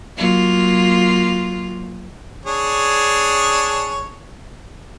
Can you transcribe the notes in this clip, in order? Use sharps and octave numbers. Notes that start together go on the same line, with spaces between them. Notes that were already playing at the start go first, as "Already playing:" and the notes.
F#3 A#3 F4
D4 G#4 C#5